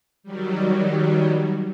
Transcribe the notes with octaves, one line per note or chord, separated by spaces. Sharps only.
D#3 F#3 G3